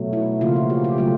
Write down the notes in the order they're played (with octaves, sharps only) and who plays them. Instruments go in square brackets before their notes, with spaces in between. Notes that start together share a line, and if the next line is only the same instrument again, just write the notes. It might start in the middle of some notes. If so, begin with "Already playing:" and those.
Already playing: [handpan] B2 F#3 A3
E4
C#3 F3 A#3 F4
F#4
G4
G4
C#3 F#3 A3 F4